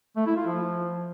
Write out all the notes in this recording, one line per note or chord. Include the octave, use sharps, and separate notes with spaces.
A3
E4
F4
F3